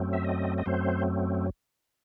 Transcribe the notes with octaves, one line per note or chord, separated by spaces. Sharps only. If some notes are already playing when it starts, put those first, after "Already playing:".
Already playing: F#2 F#3 A3 C4
E5
D#5
D#5
F#2 F#3 A3 C4 C5